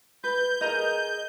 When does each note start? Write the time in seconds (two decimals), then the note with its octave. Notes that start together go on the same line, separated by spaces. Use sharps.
0.24 B4 G6
0.61 G#4 A#4 D#5